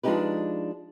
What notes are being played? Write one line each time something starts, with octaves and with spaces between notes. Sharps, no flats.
F3 G#3 D4 D#4 G4 B4